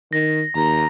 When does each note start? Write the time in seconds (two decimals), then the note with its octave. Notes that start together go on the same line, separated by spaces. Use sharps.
0.13 D#3 A#6
0.56 D#2 A#5